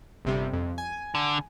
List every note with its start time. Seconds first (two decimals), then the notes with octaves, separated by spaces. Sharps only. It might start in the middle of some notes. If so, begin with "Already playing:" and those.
0.25 G1 C3 G3
0.53 F2
0.78 G#5
1.15 D3